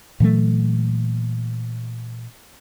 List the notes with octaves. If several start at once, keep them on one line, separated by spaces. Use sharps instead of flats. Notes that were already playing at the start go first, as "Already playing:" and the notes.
A#2 E3 F#3 A3